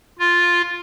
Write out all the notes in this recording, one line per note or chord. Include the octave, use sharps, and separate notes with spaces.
F4